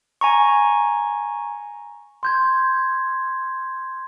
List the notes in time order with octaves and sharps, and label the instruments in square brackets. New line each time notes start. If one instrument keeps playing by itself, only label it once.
[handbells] G#5 A#5 C#6
[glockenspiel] C6 G6 G#6